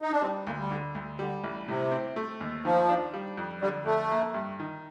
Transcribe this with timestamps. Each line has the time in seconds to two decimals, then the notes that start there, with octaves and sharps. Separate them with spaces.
0.02 D#4
0.12 D4
0.22 G3 C4
0.46 D2 A#3
0.58 G3
0.71 D3
0.95 D2
1.19 D3 G3
1.44 A1
1.67 A2 C3
1.91 C4
2.16 A3
2.41 D#2
2.65 D#3 F3
2.89 D4
3.14 G3
3.37 F2
3.62 D3 G3
3.86 F2 A3
4.11 A#3
4.34 G2
4.60 D#3